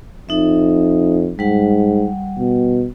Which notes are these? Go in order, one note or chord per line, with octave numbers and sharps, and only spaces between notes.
F2 D#4 E5
G#2 G3 F#5
B2